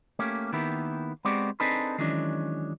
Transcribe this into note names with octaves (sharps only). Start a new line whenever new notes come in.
A3 A#3 C#4 G4
D#3 A#3 B3 E4 G4
G#3 B3 C4 F#4 G4 D5
C4 D4 D#4 G#4 A4 B4
D#3 E3 F#3 G#3 C#4 D4